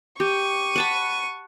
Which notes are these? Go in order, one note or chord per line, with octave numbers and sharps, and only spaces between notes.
G4 C#6 D#7
F#5 A5 B5